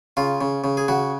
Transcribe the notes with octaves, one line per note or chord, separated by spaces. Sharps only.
C#3 F4
C#3
C#3
G#4
C#3 F#4